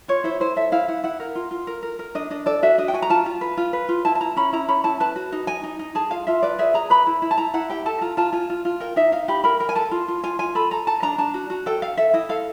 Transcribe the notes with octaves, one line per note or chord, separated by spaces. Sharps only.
F4 C#5
E4 C5
E4 C5
A4 E5
E4 F5
E4 F#5
E4 F#5
A#4
F4
F4
A#4
A#4
A#4
D4 D#5
D4 D#5
A4 D5
F#4 E5
D4 D#5
G5
F#4 G#5
A#5
F4 A5
F4
B4
F4
B4
F4
E4 A5
A5
E4 A#5
C#4 B5
E4 A#5
C#4 B5
E4 A5
B4 A5
F#4
D#4
D#4 G#5
D#4
D#4
G#4 A5
F4 F5
F4 E5
B4 D5
G#4 E5
G#4 A#5
B4 B5
E4
E4
A5
E4 A#5
E4 F#5
G4 G5
A4 A5
F4 A#5
F4 A5
F4 G#5
F4
F4
A#4 G5
D#4 E5
D#4 F5
G4 B5
A#4 B5
A#4 G5
G#5
A4 A5
F4
F4
F4 G#5
F4 G#5
A4 B5
A4 A#5
A4 A5
D4 A#5
D4 A5
F#4
F#4
A4 G5
A4 F5
A4 E5
E4 D#5
A4 F5